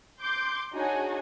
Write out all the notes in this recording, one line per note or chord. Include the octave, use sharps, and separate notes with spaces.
C6 D6 G6
D4 D#4 F#4 G#4 C#5 G#5